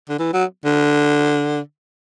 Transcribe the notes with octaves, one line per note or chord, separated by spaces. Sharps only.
D3
E3
F#3
D3